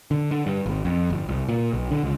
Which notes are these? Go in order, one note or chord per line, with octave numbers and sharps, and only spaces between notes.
D3
D3
G2
G#1
F2
G1
C2
A#2
B1
D3
C#2